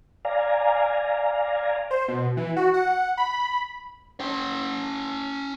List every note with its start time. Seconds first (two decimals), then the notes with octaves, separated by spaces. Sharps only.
0.25 D5 F5 G#5 A#5
1.91 C5
2.08 B2
2.37 E3
2.56 F#4
2.74 F#5
3.17 B5
4.20 C#4 G5